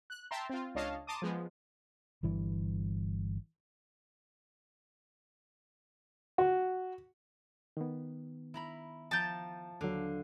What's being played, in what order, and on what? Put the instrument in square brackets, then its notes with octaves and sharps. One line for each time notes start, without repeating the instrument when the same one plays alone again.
[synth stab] F#6
E5 G5 A5 A#5 C6
C4 F4
C#2 D4 C#5 D#5 F5 A5
A5 A#5 C6 D6 D#6
F3 G#3 B3
[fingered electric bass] G1 G2 E3
[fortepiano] F#4
[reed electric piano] D#3 B3
[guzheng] E4 A#5 B5
[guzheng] F3 G5 A#5 [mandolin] A5 G6
[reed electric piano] D#2 F#3 [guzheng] D3 F5